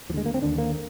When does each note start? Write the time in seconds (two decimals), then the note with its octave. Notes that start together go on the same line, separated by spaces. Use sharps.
0.09 D#2 F3
0.14 D3 G#3
0.26 A#3
0.34 C4
0.42 D#2 D3 D4
0.58 A#3